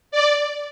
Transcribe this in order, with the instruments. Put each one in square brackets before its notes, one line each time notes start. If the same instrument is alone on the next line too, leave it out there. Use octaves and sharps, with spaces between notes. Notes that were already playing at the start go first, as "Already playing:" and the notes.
[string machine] D5